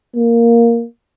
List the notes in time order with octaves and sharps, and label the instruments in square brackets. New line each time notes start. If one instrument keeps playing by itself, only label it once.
[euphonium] A#3